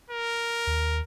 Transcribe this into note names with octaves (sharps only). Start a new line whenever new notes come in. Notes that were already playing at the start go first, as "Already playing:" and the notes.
A#4
D#2